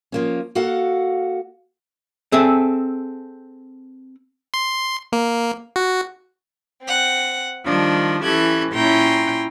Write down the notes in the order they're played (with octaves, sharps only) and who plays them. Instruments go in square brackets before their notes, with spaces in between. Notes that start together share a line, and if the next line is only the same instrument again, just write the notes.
[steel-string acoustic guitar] F3 A#3 C#4
A#3 F#4 A4 F5 F#5
[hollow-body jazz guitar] C4 G#4 A4 E5
[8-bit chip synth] C6
A#3
F#4
[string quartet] C4 F#5
D#3 F3 G3 D4
E3 C#4 G4 A4 F#6 G#6
A#2 C#4 E4 G5 A#5 C6